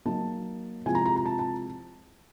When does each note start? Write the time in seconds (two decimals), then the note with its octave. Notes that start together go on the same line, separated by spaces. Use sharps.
0.05 F#3 A#3 D#4 A5
0.86 C3 F3 G#3 C4 E4 G#5
0.95 A#5
1.06 A#5
1.16 A#5
1.25 A5
1.39 A5